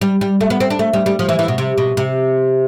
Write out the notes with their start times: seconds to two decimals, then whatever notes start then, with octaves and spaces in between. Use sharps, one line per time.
0.01 G3
0.21 G3
0.41 A3
0.50 B3
0.60 C4
0.70 D4
0.79 A3
0.93 G3
1.06 G3
1.19 F3
1.29 E3
1.39 E3
1.48 B2
1.58 C3
1.78 B2
1.97 C3